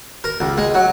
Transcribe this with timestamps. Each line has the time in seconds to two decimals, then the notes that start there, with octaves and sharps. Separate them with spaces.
0.24 A#4
0.40 C#2
0.58 G#3
0.74 F#3